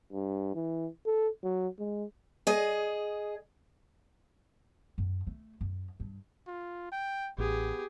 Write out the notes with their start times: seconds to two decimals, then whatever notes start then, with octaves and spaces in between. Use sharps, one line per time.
0.13 G2
0.55 E3
1.06 A4
1.43 F#3
1.79 G#3
2.47 G#4 D#5
4.98 F#2
5.27 A3
5.61 F#2
6.00 G2
6.47 F4
6.92 G5
7.38 A1 B3 G4 G#4